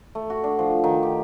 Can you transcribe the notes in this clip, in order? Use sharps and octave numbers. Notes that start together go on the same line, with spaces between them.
A3
F#4
D4
F3
D#3
G4